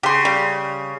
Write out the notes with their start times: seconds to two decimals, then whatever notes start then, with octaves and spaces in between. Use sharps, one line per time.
0.03 C#3 G4 C6
0.25 G3